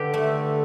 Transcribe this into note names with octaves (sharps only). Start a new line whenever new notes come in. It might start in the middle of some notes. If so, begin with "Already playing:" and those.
Already playing: D3 G4 B4
A3